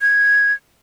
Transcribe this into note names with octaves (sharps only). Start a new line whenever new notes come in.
G#6